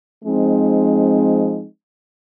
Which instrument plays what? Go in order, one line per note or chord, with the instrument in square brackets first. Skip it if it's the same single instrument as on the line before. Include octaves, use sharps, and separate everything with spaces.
[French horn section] F3 G#3 C4 D#4